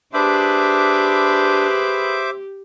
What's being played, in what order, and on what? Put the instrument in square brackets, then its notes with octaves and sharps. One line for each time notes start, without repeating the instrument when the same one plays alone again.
[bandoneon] D4 [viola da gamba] G4 [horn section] G#4 B4 [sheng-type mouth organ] C5 E5 D6